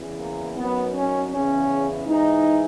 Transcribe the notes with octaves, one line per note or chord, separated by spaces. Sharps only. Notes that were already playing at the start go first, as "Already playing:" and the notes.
Already playing: E2 C#3 E3
A#3
F#2 D#3 B3
C#4
E2 C#3 E3 C#4
G#2 E3 D#4